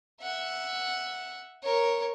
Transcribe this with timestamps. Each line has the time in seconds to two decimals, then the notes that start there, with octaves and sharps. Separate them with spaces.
0.22 E5 F#5
1.63 A#4 C#5